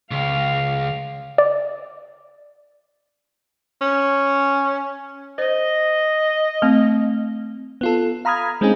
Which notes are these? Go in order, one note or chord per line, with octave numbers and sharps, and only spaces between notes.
C#2 F5
D5
C#4
C5 D#5
A3 C4
B3 F4 A4
F5 A#5 B5 D#6 F6 G#6
G#3 C4 C#4 D#4 G#4